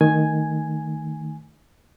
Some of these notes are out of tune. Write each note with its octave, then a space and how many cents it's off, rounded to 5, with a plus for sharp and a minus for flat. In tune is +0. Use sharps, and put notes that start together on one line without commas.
D#3 +0 A3 +20 G#5 +0